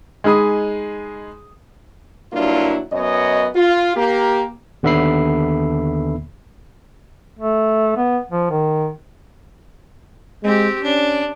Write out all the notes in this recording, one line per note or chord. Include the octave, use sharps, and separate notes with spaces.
G#3 D#4 G#4 B5 D#6
G2 F#3 A#3 D4 E4 F4
F#2 B3 C#5 D#5
F4
A#3 G4
D#2 D3 B3 E5 B5 C7
A3
B3
F3
D#3
G#3 C4 G4
C#4 D4